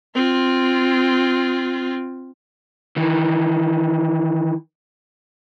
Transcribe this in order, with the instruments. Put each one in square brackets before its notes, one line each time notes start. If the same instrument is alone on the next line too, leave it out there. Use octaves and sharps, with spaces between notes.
[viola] C4 F4
[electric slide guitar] D#3 E3